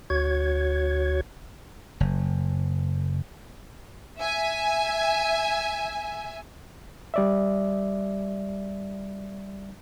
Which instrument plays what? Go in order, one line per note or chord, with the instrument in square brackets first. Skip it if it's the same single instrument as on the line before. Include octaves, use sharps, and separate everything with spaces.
[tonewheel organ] D2 F#4 C#5 G#6
[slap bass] F#1
[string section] E5 G#5
[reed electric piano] G3 D5 E5